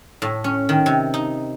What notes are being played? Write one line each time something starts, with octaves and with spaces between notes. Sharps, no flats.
A2
C#4
D#3
C3
D#4